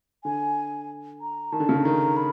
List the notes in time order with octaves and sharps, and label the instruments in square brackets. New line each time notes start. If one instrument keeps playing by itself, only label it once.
[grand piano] D3 [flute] G#5
[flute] A#5
[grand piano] D#3 [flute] A5
[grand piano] D3
C#3
D3
[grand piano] D#3 [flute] A#5
[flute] B5